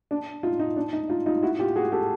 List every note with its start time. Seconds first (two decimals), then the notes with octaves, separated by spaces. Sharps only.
0.11 D4
0.43 D#4 F4
0.59 D#4
0.76 D4
0.93 D#4
1.09 D#4 F4
1.26 D#4 F4
1.43 E4 F#4
1.59 F4 G4
1.76 F#4 G#4
1.92 G4 A4